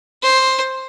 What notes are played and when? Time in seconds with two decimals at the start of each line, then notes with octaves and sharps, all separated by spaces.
0.23 C5